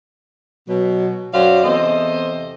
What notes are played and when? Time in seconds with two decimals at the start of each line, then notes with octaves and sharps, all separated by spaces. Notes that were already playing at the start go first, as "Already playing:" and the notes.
0.68 B2 F#3
1.33 F#2 F#3 C#4 C5 D5 F5
1.64 E2 C3 A4 C5 D#5